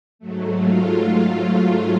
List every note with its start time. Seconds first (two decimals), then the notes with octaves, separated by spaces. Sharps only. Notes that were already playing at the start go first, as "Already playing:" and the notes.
0.19 G#2 F#3 A3
0.58 F4